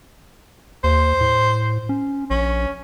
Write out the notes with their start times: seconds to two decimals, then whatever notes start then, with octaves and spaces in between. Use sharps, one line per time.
0.84 D#2 C5
1.21 A2
1.89 C#4
2.30 A#1 C#4